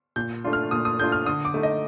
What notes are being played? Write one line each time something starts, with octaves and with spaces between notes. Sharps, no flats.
A#2 G6
A3 D4 F4
F6
A#2 D#6
D#6
A3 D4 F4 G6
F6
D3 D#6
D6
A3 D#4
D#5